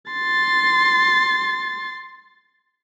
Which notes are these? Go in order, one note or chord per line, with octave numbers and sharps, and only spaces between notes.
C6 A6